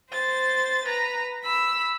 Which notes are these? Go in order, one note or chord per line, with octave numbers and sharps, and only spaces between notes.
C5 A6
B4 A#5
B5 E6